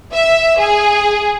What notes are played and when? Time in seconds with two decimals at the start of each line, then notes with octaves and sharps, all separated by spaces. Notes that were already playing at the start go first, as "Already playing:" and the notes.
0.12 E5
0.59 G#4